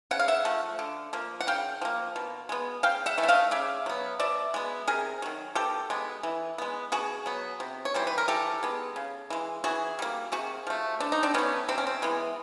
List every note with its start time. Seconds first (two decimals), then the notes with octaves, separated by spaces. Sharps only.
0.11 C#3 F#5
0.19 F5
0.28 E5 F#5
0.45 F3 A3
0.79 D3
1.13 F3 A#3
1.41 F#5
1.47 C#3 F5 G5
1.82 F3 A#3
2.16 B2
2.49 G#3 B3
2.83 C#3 F5 G5
3.06 E5 F#5
3.18 E3 A3
3.23 E5
3.28 D#5 F5
3.51 C#3 D5 E5
3.86 F#3 B3
4.19 B2 D5 E5
4.54 G#3 B3
4.87 C3 G#4 A#4
5.22 D#3 F#3
5.55 B2 G4 A4
5.90 G#3 B3
6.23 E3
6.58 G#3 B3
6.92 B2 F#4 G#4
7.26 F#3 B3
7.60 C3
7.85 C#5
7.94 E3 G3 C5
8.07 B4
8.18 A#4
8.28 E3 G4 A4
8.63 G#3 B3
8.96 C#3
9.30 E3 G#3
9.64 E3 F#4 G#4
9.99 G3 A#3
10.32 C3 F#4 G#4
10.67 F3 A3
11.00 D3 D4
11.12 D#4
11.23 C4 D4
11.34 F#3 A3 B3 C#4
11.68 C3 C4
11.78 C#4
11.87 C4
12.02 E3 G#3 B3